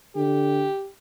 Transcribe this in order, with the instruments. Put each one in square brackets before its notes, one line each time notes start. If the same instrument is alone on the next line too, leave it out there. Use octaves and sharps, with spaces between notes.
[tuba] D3 [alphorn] G4